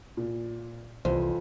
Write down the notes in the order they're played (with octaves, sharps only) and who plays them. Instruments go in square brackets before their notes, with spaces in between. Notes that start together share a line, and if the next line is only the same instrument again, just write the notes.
[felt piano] A#2
[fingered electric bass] C2 [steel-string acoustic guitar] F2 [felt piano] E3 [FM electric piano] C5